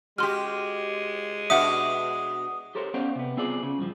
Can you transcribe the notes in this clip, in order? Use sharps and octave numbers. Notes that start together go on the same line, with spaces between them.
G#3 F#4 G4 C6 F6
B2 D4 F#4 E5 F#5 D#6
G4 A4 A#4 C5 C#5
B3 C#4 C5 D5 F5
C3 B3
B3 C4 F4 G#4 C5 D5
C#3
G2 F3